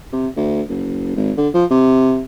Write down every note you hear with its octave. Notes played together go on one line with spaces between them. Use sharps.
C3
D2
F#1
G#1
D3
F3
C3